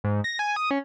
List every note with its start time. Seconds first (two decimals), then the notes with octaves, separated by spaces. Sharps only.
0.04 G#2
0.24 A#6
0.39 G#5
0.56 D#6
0.71 C#4